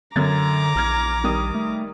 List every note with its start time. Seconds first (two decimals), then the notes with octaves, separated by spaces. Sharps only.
0.16 F#2 D3 A#5 D6 G#6 A6
0.75 A#1 E2 F6 G#6
1.24 D#3 G3 D#6
1.55 A3